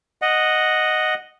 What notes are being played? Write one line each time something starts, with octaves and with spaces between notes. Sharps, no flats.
D#5 F#5